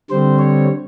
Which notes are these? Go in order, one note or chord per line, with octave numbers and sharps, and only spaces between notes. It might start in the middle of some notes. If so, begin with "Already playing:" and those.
D3 G3 C4 C5
C#5